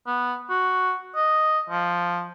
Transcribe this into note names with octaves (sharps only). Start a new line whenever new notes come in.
B3
F#4
D#5
F3